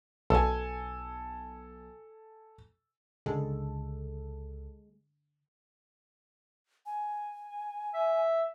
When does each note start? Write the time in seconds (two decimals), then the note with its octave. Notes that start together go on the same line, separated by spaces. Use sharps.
0.30 B1 A4 G#5
3.26 C#2 D3 G#3 A4
6.86 G#5
7.94 E5